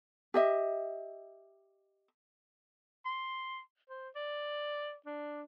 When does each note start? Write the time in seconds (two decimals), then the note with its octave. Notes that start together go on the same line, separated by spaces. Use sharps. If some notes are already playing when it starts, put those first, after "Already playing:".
0.34 G4 D#5 E5
3.06 C6
3.90 C5
4.16 D5
5.06 D4